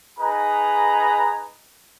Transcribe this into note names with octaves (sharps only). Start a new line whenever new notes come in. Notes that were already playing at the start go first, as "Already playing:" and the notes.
D#4 G#4 B4 A#5